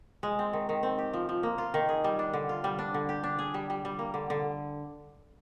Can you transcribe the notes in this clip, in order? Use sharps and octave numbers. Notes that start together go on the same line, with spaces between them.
G#3
C4
D#3
D#3
C4
G4
F3
F3
A#3
F4
D#3
G#4
G3
D4
D3
F4
G3
D4
D3
G4
D4
G#4
G3
G3
G3
A#3
D3
D3